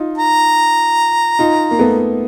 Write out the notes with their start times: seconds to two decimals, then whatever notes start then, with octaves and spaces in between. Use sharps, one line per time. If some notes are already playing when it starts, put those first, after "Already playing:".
Already playing: D#4 F4
0.18 A#5
1.39 D#4 F4
1.71 A#3
1.79 A3 B3